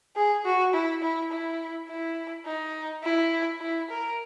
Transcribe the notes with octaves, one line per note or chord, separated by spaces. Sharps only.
G#4
F#4
E4
E4
E4
E4
D#4
E4
E4
A#4